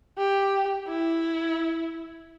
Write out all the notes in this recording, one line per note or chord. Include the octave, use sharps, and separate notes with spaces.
G4
E4